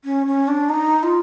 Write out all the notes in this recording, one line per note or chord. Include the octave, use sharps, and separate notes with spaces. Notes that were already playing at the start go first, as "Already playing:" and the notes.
C#4
C#4
D4
D#4
F4